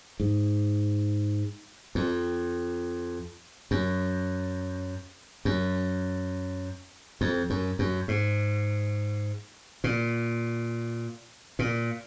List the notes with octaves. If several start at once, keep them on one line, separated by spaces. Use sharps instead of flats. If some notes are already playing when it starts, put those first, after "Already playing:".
G#2
F2
F#2
F#2
F2
F#2
F#2
G#2
A#2
A#2